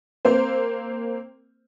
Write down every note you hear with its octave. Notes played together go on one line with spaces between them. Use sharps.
A#3 C4 C5